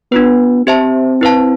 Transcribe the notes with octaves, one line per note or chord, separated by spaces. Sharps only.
B3 D4 F4 B4
C4 G4 C5 E5 A5
E4 B4 F5 A5